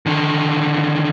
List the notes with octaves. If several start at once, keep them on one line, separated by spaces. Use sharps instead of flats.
D3 D#3